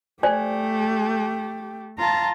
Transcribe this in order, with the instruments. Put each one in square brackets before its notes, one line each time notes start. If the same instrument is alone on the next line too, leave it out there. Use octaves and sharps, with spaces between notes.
[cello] A3 [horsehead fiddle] G4 [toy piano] C5 D5 G#5
[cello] F4 [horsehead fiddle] A5 A#5